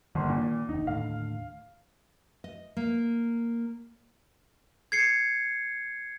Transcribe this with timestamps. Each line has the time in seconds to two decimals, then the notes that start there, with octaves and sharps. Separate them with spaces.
0.15 G1 D#3 A#3 C6
0.29 A#2
0.69 F1 D#2 D#4
0.87 D#2 A2 D3 F5
2.44 D#5
2.77 A#3
4.92 G#6 C7 C#7